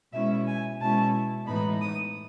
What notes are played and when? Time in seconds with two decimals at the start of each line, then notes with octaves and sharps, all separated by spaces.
0.12 B2 G#3 C#4 E4 E5
0.47 G#5
0.80 B2 G#3 C#4 E4 A5
1.46 A2 E3 G#3 B3 D#4 B5
1.81 D#6